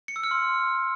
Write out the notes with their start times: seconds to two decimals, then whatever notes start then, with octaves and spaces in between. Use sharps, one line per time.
0.08 C#7
0.16 E6
0.24 F6
0.31 C6